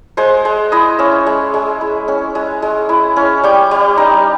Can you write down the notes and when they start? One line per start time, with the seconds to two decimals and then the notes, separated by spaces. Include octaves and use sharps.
0.17 G#3 C5
0.45 G#3
0.72 E4 D#5
0.99 C#4 E5
1.26 G#3
1.54 G#3
1.81 E4
2.08 C#4
2.35 G#3
2.62 G#3
2.89 E4
3.16 C#4
3.43 G3 G5
3.71 G3
3.97 D#4